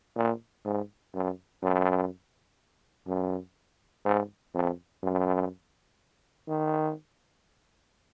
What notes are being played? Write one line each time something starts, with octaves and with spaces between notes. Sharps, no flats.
A#2
G#2
F#2
F#2
F#2
G#2
F2
F#2
D#3